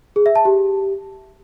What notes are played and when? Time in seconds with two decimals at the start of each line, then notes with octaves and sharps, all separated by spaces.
0.16 G#4
0.26 E5
0.36 A5
0.45 G4